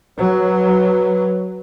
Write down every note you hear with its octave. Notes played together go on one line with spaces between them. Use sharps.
F#3 B4